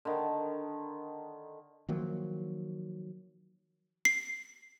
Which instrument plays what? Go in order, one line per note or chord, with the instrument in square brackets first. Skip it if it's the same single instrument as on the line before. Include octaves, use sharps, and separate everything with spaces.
[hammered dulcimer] D3 D#3
[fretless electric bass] D#3 F3 F#3 A#3
[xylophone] C7